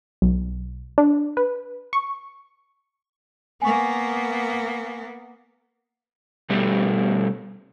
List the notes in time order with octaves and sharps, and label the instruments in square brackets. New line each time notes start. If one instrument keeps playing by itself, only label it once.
[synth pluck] B1
D4
B4
C#6
[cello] A#3 B3 [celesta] G#5 C#6
[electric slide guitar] B2 G3 A3 G4